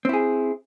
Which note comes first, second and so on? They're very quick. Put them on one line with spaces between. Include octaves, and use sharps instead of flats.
C4 E4 G#4